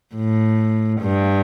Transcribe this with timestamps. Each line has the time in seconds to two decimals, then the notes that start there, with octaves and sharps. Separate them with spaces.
0.15 A2
1.01 G2